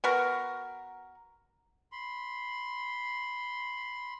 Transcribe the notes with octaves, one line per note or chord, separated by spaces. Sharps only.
B3 F#4 A#4
B5 C6